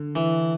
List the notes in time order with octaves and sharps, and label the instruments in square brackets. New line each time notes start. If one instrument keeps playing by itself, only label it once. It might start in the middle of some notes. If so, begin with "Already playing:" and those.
Already playing: [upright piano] D3
[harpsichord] E3